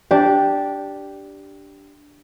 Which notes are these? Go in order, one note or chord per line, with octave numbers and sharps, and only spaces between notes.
D4 G4